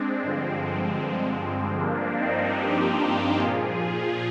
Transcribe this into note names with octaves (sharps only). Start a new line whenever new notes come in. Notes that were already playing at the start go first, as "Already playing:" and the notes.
Already playing: G#3 C4 D4
G2 D3 F3 G#3 C4
G2 F3 A#3 D4
C4 D#4
D#4 G4
A#2 F3 F4 G#4